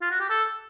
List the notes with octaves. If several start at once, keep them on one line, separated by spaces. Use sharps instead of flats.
F4
F#4
G4
A4